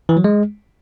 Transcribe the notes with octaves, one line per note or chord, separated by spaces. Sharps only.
E3
F#3
G#3